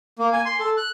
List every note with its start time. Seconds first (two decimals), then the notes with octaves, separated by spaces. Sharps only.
0.19 A#3
0.33 G#5
0.45 C6
0.60 A4
0.77 F#6